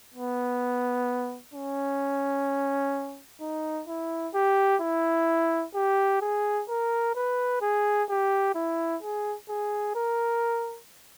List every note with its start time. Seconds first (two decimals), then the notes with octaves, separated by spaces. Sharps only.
0.14 B3
1.54 C#4
3.41 D#4
3.87 E4
4.34 G4
4.81 E4
5.75 G4
6.21 G#4
6.69 A#4
7.15 B4
7.62 G#4
8.09 G4
8.55 E4
9.03 G#4
9.49 G#4
9.95 A#4